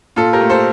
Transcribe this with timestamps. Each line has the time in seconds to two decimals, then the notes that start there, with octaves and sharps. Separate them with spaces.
0.16 A#2 F4 A4
0.33 G4 A#4
0.41 A3
0.50 A4 C5